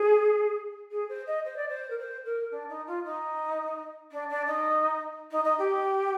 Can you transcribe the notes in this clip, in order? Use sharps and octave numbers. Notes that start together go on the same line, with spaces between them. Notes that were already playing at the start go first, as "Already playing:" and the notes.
Already playing: G#4
G#4
C5
D#5
C5
D5
C5
A#4
C5
A#4
D4
D#4
F4
D#4
D4
D4
D#4
D#4
D#4
G4